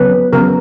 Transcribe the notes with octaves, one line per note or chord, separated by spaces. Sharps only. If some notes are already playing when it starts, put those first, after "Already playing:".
Already playing: C#3 F#3 B3 B4
C#3 F#3 B3 A#4